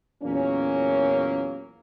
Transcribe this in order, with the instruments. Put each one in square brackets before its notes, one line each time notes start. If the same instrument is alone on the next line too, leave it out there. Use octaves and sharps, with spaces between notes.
[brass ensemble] E2 A#2 F#3 A#3 C#4